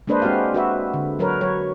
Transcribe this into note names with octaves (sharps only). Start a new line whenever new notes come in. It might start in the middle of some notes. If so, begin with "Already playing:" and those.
G#3 A#3 D4 B4 C5 D#5
G#3 C4 F#4 G4 F5
F#4 B4 E5
D3
F#3 A#4 B4 C#5
F#3 C#5